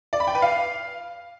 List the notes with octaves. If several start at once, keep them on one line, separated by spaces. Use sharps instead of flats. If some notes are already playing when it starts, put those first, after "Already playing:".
D5
B5
G5
B4
F5